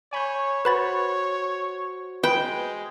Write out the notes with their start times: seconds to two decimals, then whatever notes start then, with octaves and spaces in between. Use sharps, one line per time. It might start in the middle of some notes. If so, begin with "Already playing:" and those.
0.13 C#5 G#5 B5 G6
0.65 F#4 B4 C5 B5 A6
2.24 G#3 B4 G5 B5